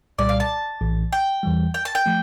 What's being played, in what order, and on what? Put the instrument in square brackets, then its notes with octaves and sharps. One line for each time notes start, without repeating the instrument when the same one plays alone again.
[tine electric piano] C2 A#2 G3 [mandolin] D5
[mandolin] F5
A5
[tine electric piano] A#1 A2 E3
[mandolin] G5
[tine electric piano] E2 E3 G3
[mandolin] G5
A5
G5
[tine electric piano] F3 A3